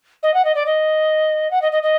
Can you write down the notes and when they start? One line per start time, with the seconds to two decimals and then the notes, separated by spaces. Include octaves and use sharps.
0.23 D#5
0.34 F#5
0.45 D#5
0.55 D5
0.66 D#5
1.51 F#5
1.62 D#5
1.72 D#5
1.83 D#5